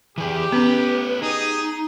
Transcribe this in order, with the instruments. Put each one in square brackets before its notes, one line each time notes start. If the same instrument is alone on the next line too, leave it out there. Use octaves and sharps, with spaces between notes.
[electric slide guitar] E3 G#4 [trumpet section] G4
[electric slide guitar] A3 B4 [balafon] B3 C#4
[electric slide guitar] D#4 [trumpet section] G4 G#4 D#6